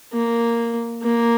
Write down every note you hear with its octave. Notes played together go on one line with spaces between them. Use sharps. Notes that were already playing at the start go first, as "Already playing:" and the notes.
A#3
A#3